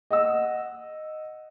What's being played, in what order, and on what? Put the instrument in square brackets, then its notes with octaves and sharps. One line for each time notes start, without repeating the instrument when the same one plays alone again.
[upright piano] D#5 F#5 E6